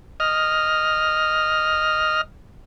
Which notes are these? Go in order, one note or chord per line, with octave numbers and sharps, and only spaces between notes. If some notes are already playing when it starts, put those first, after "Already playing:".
D#5 F6